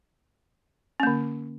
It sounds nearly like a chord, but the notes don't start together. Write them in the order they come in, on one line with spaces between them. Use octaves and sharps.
C#4 A#3 D3